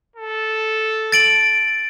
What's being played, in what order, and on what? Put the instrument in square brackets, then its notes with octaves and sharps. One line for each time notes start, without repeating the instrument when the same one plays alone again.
[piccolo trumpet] A4
[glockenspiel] A6 D7 F#7